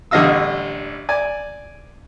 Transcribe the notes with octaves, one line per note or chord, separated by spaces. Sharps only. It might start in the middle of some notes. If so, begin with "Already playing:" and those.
A1 D3 G3 D#5 F5 E6
D5 G#5